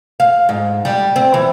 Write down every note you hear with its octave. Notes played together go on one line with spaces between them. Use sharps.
F5
G#2
G3
C4
E3